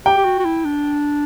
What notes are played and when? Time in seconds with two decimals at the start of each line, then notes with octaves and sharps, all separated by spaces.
0.06 G4 G5
0.17 G4
0.25 F#4
0.39 F#4
0.45 E4
0.65 D4